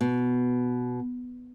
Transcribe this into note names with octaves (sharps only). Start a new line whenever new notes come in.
B2